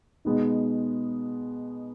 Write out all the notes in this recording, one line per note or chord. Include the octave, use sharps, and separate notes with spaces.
B2 G#3 B3 D#4